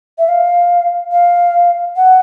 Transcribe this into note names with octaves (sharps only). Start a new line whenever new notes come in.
E5
F5
F5
F#5